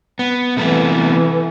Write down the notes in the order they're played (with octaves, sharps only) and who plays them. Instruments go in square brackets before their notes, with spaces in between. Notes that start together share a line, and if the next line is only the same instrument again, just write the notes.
[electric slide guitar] B3
[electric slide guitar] C3 A3 B3 [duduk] E3